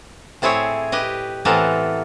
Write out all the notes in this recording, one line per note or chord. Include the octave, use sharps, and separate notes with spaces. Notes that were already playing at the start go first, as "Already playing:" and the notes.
A2 C4 E4 G#4 C#5
G4 B4 D#5
A2 E3 B3 C4 A4 A#4